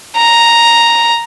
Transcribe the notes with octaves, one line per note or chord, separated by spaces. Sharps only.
A#5